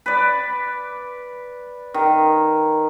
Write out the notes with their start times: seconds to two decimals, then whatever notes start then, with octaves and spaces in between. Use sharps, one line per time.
0.06 B4 D5
1.94 D#3